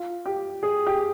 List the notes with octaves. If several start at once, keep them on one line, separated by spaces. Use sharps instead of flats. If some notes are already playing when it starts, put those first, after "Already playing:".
Already playing: F4
G4
G#4
G4